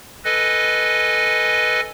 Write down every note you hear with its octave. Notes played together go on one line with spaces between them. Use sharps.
A4 B4 D#5 G#5